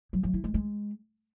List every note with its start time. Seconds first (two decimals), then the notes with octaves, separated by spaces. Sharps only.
0.13 F#3
0.23 F#3
0.34 E4
0.44 G#3
0.54 G#3